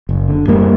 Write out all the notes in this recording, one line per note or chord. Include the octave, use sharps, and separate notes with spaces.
F#1
D3
F#2 G3 A#3